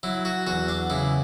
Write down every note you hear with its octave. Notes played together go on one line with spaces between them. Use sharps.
F#3 E4
F#4
E2 F#4
D4
C#3 E4